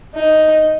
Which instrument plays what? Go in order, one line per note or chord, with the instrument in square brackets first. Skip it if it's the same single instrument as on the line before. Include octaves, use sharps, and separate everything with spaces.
[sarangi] D#4